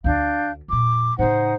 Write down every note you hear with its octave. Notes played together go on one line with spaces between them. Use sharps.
D2 D3 D4 F5 G6
F2 A#2 D6
A2 C#3 D#4 C5 F#5